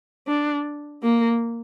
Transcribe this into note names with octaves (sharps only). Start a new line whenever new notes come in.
D4
A#3